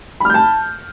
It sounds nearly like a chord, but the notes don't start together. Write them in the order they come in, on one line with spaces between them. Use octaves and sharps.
B5 F6 G6 A5